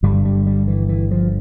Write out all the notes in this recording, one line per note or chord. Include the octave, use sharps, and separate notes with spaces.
G1 G2 D3 G3
G3
G3
E3
E3
F3